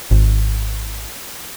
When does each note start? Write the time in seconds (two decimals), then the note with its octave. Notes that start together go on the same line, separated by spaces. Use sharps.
0.11 G#1